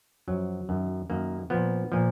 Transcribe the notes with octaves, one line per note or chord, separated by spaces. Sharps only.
F#2 F3 F#3
F#2 D#3
F#2 D#3 A#3
A#2 F3 B3
A#2 F3